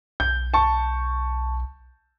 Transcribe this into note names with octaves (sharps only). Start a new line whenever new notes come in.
B1 G6
A5 C#6